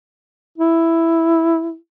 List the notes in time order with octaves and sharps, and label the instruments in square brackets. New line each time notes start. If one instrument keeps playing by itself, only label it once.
[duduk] E4